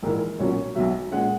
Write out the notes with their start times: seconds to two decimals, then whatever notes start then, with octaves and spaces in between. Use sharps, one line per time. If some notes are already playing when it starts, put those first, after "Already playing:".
0.03 A#1 G#2 E3 A#3 A#4
0.39 B1 A#2 F#3 A#3 C#4 C#5
0.75 B1 B2 F#3 E5
1.11 A#2 G#3 C#4 F#5